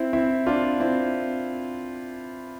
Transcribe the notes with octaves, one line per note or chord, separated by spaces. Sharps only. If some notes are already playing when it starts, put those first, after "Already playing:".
Already playing: C4 E4
C4 E4
D4 F4
C4 E4